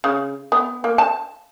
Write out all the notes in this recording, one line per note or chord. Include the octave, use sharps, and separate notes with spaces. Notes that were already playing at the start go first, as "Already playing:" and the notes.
C#3
B3
A#3
A5